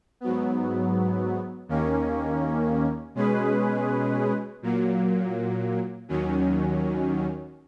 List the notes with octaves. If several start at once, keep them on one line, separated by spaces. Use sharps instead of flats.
G#2 F#3 B3
D#2 D#3 A#3 C#4
B2 G#3 C#4 G#4 B4
A#2 F#3 A#3
D#2 D#3 F#3 C#4